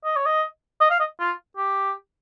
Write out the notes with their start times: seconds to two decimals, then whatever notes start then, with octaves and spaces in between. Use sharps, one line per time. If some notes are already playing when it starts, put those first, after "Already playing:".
0.05 D#5
0.16 C#5
0.26 D#5
0.81 D#5
0.90 F5
1.00 D#5
1.20 F4
1.57 G4